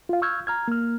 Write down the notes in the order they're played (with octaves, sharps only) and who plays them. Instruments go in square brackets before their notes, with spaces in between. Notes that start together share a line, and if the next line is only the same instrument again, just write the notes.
[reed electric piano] F4 F5
C#6 E6 F6 G6 G#6
A#5 F6 G#6
A#3 F6